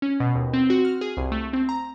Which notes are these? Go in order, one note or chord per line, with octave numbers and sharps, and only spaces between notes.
C#4
B2
D#2
C4
F#4
F6
G#4
C2
A3
C4
A#5